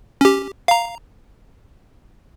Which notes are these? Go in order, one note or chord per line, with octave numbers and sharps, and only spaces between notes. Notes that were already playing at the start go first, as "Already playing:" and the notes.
C#4 G4
F5 A#5